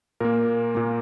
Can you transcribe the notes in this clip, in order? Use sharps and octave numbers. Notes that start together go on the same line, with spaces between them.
A#2 A#3 A#4
A#2 A#3